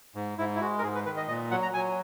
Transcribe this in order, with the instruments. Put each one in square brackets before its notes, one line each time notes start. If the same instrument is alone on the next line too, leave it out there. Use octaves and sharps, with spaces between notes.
[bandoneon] G#2
G#2 E4
E4
G#3 F#4
A#4
G#2 G#4
B4
D#3 B4
D#5
A#2 D#5
F#3 F#5
A#5
F#3 G#5